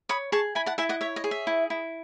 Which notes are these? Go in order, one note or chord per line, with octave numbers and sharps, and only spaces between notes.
C#5 B5 D#6
G#4 A5 C#6
E4 G#5 B5
F#5 A5
E4 E5 G#5
D#5 F#5
C#5 E5
D#5
G#4
E5
E4
E4